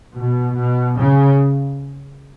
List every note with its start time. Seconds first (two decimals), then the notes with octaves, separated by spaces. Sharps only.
0.16 B2
0.56 B2
0.98 C#3